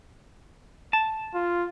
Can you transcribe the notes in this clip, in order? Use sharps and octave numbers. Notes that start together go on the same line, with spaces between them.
A5
F4